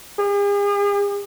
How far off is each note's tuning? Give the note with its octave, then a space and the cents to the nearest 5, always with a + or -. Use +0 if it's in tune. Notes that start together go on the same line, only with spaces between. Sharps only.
G#4 -45